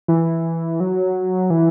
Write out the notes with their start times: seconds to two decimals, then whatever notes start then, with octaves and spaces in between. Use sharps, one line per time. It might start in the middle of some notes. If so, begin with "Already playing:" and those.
0.08 E3
0.80 F#3
1.50 E3